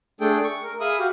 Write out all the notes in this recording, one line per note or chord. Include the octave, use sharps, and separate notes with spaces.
A3 D4 G#4 A4 G5
C#6
A#4
G#4 E5 F5 B5 D#6
F#4 G4 F5